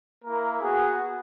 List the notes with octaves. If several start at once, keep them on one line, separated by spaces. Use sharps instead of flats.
A#3 E4 A#4
B3 F#4 G#4